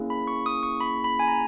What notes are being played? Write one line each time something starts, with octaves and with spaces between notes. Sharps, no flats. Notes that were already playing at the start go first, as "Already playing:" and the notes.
Already playing: A#3 C#4 E4 G#4
B5
C#6
D#6
C#6
B5
B5
G#5
A#5